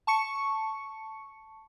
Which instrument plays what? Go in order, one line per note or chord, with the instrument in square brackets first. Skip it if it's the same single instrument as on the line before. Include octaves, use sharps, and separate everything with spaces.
[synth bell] A5 C#6 C#7